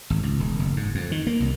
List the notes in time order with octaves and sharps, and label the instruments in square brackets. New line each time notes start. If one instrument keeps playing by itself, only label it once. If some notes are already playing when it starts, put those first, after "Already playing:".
[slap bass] G#1
C#2
E1
F#1
G#2
F2
D#3
A#3
C2